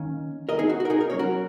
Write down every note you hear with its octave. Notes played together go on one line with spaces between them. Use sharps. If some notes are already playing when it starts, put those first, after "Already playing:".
Already playing: D#3 A#3 C#4
A#4 D#5
D#4 G#4
F#4
F#4
A#4
D#4 G#4
A#4
F#3 A#3 C#4 C#5
F#4 A#4